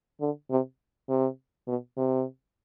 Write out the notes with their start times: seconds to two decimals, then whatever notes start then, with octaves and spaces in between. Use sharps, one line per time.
0.21 D3
0.51 C3
1.09 C3
1.68 B2
1.98 C3